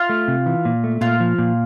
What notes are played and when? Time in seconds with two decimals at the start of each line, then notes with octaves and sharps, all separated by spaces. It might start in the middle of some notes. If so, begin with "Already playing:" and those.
Already playing: F4
0.09 A3
0.28 C3
0.46 E3
0.65 A#2
0.84 A3
1.01 A#2 F4
1.20 F3
1.38 A#2